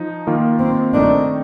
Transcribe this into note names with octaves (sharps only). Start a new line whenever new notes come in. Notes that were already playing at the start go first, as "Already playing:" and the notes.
Already playing: F3 D#4
D#3 A#3 F4 A#4
C4
D#3 A3 C4 D4 D#4